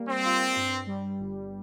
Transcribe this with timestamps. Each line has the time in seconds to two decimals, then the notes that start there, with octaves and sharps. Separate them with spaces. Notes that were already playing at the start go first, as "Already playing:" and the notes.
Already playing: G3 A#3
0.08 C4
0.24 F4
0.56 G2
0.86 G3
1.18 G1